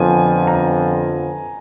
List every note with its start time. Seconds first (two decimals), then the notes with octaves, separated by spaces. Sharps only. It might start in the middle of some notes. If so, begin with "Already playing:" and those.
Already playing: F2 D3 F3 B3 G#5
0.47 A#5